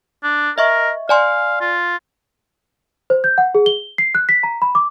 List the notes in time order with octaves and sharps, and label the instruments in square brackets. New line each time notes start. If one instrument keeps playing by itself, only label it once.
[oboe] D4
[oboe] A#4 [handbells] D#5 E5 C#6
[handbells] D5 G#5 C6 [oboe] F5
[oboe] F4
[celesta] C5
G6
F#5
G#4
G7
C7
F#6
B6
A#5
B5
D6